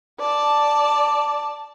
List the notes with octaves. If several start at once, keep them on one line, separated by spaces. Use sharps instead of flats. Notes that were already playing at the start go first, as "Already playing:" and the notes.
D5 A5